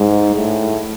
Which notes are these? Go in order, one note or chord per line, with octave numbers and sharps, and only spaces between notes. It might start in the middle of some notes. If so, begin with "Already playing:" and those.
Already playing: G#2
A2